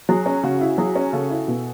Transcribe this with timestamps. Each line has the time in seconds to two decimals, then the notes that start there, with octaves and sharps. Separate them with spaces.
0.09 F#3 G#4
0.26 C#4
0.43 C#3 F#4
0.61 E4
0.78 F#3 G#4
0.95 C#4
1.13 C#3 A4
1.31 E4
1.48 B2